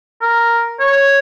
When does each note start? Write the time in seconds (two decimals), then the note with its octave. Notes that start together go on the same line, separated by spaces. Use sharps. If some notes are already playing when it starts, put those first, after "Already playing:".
0.22 A#4
0.80 C#5